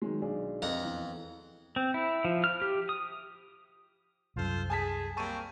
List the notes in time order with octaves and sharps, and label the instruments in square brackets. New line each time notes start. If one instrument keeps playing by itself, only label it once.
[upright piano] D#3 F#3 G#3
B1 D4 G#4
[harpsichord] F2 F#5 A#5 [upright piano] B4 D#5
[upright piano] E2
[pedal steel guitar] C4
E4
F3
F6
G4
D#6
[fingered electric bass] C2 F#2 [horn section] F4 A4 C5
[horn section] G#4 [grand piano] G#5 A5 B6
[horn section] G3 A#3 C4 [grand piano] A5 C#6 D#7